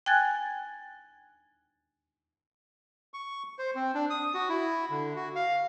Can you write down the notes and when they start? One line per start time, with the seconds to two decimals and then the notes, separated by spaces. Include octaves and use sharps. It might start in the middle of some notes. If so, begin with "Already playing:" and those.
0.06 G5 G#5 F#6 G#6 A6
3.14 C#6
3.59 C5
3.75 C4
3.94 D4
4.10 D#6
4.34 F#4
4.49 E4
4.91 D3
5.16 F#4
5.36 F5